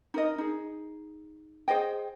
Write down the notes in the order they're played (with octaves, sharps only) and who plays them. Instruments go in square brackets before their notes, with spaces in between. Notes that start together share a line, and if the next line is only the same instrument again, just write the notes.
[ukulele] D#4 A#4 D#5
D#4 G#4
G#4 C5 D#5 G5